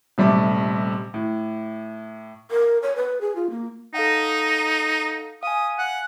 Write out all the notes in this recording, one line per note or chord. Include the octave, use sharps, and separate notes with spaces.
D#1 C3 G3 A3 D6
A2
A#4
C#5
B4
G#4
F4
A#3
D#4 A4 F5 F#5
F5 G#5 D#6
F#5